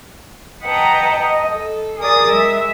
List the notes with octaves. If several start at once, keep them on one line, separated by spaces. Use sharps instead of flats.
B4 D#5 F#5 G5 A5 A#5
D#5
A4
G#4 A#4 D5 D#6 A6
G#3 E5